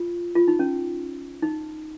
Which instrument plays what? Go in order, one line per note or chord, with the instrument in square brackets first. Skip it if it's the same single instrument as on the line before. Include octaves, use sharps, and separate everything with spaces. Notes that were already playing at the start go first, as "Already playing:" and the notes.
Already playing: [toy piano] F4
F4
D#4
C#4
D#4